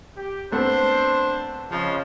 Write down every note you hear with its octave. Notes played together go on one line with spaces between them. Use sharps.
G4
A3 B3 C4 D4 C5
C#3 F3 G#3